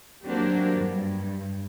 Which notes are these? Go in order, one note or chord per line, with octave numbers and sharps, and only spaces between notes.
F#3 A#3 C4 D4 F#4 G4
G2